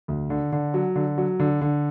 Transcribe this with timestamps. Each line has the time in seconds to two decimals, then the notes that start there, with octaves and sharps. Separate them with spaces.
0.08 D2
0.30 D3
0.52 D3
0.74 F#3
0.95 D3
1.18 F#3
1.40 D3
1.61 D3